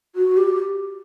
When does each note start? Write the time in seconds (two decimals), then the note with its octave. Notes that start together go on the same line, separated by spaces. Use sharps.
0.15 F#4
0.37 G4